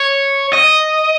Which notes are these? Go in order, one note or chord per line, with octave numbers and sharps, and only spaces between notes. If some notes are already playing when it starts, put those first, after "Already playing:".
Already playing: C#5
D#5